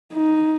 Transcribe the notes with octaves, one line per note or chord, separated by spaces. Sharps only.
D#4